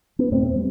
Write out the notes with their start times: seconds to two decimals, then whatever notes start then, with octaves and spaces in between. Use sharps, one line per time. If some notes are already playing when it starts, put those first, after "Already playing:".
0.19 B3
0.31 E2 B2 A3 C4
0.45 C4
0.56 G3